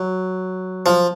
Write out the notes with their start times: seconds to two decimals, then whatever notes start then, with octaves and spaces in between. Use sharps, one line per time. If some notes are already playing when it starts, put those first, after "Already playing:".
Already playing: F#3
0.86 F3